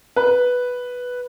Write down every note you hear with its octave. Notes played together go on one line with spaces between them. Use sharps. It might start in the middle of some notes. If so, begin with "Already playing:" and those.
B4